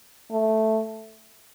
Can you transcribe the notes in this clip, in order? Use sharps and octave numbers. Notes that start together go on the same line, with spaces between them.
A3